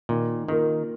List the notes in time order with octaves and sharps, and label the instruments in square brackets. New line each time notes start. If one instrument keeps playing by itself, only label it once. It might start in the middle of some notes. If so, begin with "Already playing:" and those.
[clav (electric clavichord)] A#2 [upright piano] D#3
[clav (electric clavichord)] D#3 [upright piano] A#3 F4 A#4